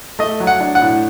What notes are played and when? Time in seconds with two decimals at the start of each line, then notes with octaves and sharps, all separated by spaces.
0.19 A3 D#5
0.40 F#3
0.47 F#5
0.61 D4
0.75 F#5
0.82 A2